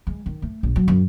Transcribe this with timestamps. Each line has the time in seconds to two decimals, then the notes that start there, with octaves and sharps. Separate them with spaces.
0.07 G#3
0.26 D#3
0.42 A3
0.63 A#1
0.76 F#3
0.88 F#2